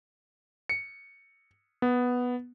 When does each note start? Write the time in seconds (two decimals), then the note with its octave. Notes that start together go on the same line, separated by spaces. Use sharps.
0.69 C#7
1.82 B3